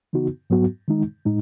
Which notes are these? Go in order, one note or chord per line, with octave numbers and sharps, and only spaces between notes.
C#3 E3 B3 D#4 F#4
G#2 F#3 B3 F#4
D#3 G#3 D#4
A2 G#3 D#4